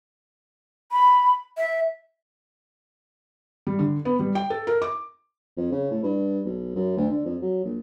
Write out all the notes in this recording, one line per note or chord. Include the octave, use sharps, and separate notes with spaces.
B5
E5
G3
D3
B3
G3
G5
A4
A#4
D6
F2
C#3
A2
G2
B1
F#2
D2
D3
F2
F#3
A#1